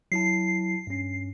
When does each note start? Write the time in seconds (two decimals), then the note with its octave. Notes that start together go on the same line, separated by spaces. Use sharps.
0.12 F#3 E4 A5 C7
0.87 G2 C#4